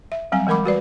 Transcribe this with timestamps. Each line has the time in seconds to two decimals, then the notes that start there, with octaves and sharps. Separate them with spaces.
0.12 E5
0.32 F#3 G3 C4 G#5
0.47 E3 G#3 A#4 B5 D6
0.64 G3 F#4 B4 D5